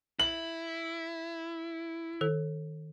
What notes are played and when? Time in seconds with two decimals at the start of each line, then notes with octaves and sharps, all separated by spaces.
0.20 E4 F#7
2.21 D#3 A4